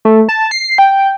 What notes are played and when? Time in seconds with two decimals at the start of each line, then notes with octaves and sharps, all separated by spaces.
0.05 A3
0.29 A5
0.51 C7
0.78 G5